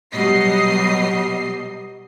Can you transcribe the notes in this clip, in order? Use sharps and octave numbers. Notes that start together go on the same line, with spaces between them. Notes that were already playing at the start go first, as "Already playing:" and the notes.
B2 F#3 G3 D#5 C7